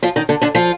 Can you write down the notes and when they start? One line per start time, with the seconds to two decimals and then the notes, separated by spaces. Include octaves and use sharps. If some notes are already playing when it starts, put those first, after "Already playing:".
0.03 F3 F4
0.16 D#3 D#4
0.29 D3 D4
0.41 D3 D4
0.55 F3 F4